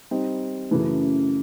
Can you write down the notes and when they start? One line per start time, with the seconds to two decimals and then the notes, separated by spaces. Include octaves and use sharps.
0.11 G3 C4 D#4
0.71 F#2 C#3 E3 A3